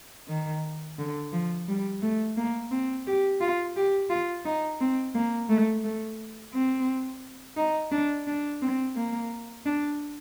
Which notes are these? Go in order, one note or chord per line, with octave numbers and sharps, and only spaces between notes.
D#3
D3
F3
G3
A3
A#3
C4
G4
F4
G4
F4
D#4
C4
A#3
A3
A3
C4
D#4
D4
D4
C4
A#3
D4